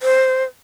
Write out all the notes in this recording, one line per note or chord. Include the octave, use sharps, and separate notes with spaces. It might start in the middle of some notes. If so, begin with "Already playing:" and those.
C5